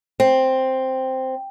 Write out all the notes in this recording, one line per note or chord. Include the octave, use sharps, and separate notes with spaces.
C4